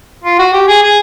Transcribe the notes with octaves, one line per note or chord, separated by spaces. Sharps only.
F4
F#4
G4
G#4
G#4